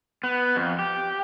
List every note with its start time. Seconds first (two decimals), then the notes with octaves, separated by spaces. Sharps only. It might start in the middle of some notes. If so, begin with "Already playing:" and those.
0.24 B3
0.56 F2
0.79 G4